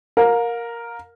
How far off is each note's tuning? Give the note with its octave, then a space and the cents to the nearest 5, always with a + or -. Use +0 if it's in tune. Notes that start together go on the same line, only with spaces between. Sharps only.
A#4 +0 F5 +35